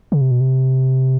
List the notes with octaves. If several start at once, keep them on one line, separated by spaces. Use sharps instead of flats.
C#3
C3
B2
C3